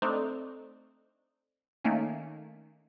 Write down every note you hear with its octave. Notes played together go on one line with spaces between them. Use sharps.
A3 C4 D4 D#4
D#3 A3 A#3 C#4